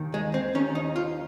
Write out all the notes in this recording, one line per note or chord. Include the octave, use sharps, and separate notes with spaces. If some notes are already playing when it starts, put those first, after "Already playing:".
Already playing: D#2 D#3
G#3
C4
D#2 D#3 C#4
D#4
F4